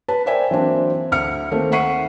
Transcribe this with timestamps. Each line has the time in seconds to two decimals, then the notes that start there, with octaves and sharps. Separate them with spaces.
0.08 B4 A5
0.26 A#4 C5 D5 E5 G5 G#5
0.51 E3 F#3 A#3 C4 D4
1.12 D2 F6 C#7
1.51 D#3 A3 A#3 C4
1.72 E5 F#5 C#6 C7 C#7 D#7